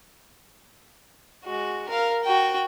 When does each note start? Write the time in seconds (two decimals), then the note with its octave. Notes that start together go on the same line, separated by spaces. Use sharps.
1.45 G#3 F#4
1.89 A#4 F5
2.24 F#4 G5